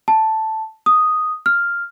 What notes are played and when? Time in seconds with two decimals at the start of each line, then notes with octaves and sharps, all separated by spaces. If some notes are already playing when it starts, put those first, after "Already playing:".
0.08 A5
0.86 D#6
1.46 F6